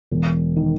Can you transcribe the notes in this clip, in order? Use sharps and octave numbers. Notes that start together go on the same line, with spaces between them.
E1
D#3